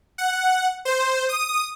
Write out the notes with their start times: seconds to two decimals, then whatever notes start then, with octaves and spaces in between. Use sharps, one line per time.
0.18 F#5
0.85 C5
1.29 D#6